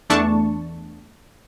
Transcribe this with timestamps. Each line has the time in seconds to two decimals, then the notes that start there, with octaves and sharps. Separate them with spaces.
0.10 E2 A3 D4 A5 C#6